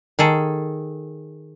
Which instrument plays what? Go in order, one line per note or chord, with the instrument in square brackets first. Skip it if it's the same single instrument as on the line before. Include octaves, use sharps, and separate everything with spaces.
[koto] D#3 G#4 A4